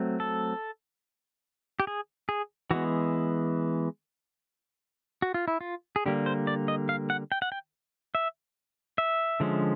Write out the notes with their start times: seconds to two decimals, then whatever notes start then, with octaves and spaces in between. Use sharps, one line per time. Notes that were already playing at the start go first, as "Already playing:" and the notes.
Already playing: F#3 A3 C4
0.20 A4
1.80 G4
1.87 G#4
2.29 G#4
2.71 E3 G#3 B3 F#4
5.22 F#4
5.34 F4
5.48 E4
5.61 F4
5.96 G#4
6.06 D3 G3 A#3 G4
6.26 C5
6.47 D5
6.68 D#5
6.89 F5
7.10 F#5
7.32 G5
7.42 F#5
7.52 G5
8.15 E5
8.98 E5
9.40 D3 F3 G#3 C#4